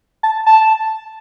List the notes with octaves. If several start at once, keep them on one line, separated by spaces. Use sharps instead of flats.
A5
A5